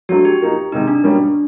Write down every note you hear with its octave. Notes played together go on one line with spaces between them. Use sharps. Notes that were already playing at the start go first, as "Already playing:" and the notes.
F#3 A3 D4 F#4
G4
F3 A#3 D#4
C3 D#3 G#3 D#4
D4
B2 G3 A#3 C#4